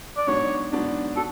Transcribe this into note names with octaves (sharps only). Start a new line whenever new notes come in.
D5
G#2 F#3 B3 D4 C#5
G#2 F#3 B3 D4
F#4 A4